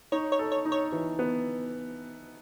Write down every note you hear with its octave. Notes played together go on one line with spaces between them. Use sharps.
D#4 C#5
C#5
A4
C#5
D#4
C#5
E3
B3